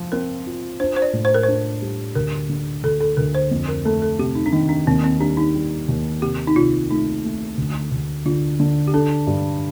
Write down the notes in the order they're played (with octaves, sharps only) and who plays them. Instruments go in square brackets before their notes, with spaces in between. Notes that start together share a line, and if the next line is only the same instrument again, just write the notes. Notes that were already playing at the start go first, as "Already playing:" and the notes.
Already playing: [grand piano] F3 F4
[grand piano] C4 [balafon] A#4
[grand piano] F4
[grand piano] D4 [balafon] C5
[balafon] C5
D5
[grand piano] A2
[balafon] C5
A#4
[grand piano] D4 [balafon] C5
[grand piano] G3
[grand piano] D2 [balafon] A#4
[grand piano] D3
[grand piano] D2 [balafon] A4
[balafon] A4
[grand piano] D2 [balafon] A#4
[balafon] C5
[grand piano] F2
[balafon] A#4
[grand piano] A3 [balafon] A4
[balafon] A4
[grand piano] C3 [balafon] G4
[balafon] D#4
D4
[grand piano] D#3 [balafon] D#4
[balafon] D4
[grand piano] D#2 [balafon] C4
[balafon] C4
[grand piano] G3 [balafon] D4
[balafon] D#4
[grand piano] G3
D#2
[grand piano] C3 [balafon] G4
[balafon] D#4
[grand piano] C2 [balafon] F4
[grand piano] A3 [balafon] D#4
[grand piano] A3
D2
D2
[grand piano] D3 [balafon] F4
[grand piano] D3
[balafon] G4
[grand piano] D4 [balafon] A4
[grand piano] G2